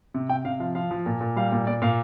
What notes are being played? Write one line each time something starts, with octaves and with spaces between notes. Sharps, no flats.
C3
C3 G5
C3 F5
F3 F5
F3 F5
F3
A#2
A#2
G3 F5
A#2
A#2 D5
A#2 F5